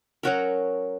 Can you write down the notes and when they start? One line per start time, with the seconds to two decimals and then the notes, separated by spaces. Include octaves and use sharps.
0.23 F#3 C#4 F#4 A#4